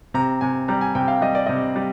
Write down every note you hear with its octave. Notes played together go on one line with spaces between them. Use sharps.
C3 A#5
C3 G#5
G3 A#5
G#5
C3 G5
F5
G3 D#5
D5
C3 D#5
G3